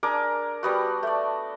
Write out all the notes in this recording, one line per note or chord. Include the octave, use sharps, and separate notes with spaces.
D4 G#4 A#4 D6
G3 B3 F#4
A3 D5